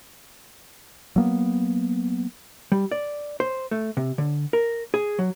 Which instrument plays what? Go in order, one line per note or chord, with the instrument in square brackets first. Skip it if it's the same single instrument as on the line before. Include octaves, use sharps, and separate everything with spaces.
[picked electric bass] F#3 A#3 B3
[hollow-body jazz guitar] G3
D5
C5
A3
C3
D3
A#4
G#4
F#3